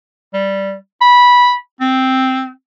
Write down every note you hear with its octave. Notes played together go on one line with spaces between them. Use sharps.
G3
B5
C4